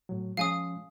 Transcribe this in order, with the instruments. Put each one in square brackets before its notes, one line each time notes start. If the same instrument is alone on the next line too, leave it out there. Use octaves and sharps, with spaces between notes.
[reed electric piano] A2 F#3
[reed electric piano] F3 G#3 C#4 [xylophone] F5 G#5 D#6